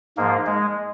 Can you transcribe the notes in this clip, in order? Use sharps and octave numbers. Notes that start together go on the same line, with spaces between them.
G#2 F3 A#3
G#3